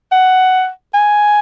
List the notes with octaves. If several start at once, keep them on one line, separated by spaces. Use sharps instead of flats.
F#5
G#5